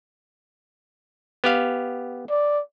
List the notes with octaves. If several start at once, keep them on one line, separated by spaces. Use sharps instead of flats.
B3 G4 F5
D5